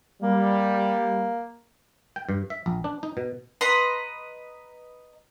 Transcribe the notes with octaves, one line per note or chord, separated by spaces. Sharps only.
G3 A#3
G5
G2
E5
A#1
D4
D#4
B2
B4 D#5 A#5 C6